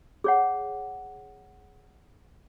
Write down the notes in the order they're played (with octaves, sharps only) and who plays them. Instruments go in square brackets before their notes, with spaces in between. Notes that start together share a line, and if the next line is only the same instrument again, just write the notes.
[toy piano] G#4 C#5 F#5